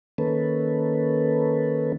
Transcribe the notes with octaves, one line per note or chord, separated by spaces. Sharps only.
D#3 A#3 C#4 A4 B4